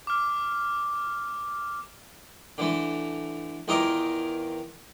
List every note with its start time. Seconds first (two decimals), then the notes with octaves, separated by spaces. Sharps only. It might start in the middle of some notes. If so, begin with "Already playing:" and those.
0.07 D6 F6
2.58 D3 E3 A3
3.68 E2 D#3 F4 A#4 D#5 D6